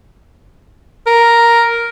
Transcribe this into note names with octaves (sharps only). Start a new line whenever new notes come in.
A#4